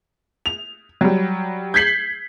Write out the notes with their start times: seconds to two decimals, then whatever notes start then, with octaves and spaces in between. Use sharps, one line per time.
0.46 F7
1.01 F#3 G3
1.74 G6 G#6 B6 C7 F#7